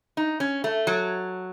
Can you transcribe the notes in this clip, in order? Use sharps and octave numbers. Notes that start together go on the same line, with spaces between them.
D#4
C#4
A3
F#3